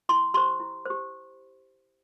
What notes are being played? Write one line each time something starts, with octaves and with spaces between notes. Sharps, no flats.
E4 C6
G4 C5 C6
E4
G4 C5